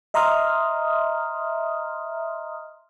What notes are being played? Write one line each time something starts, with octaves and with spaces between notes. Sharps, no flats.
D#5 E5 A#5 C6 D#6 F6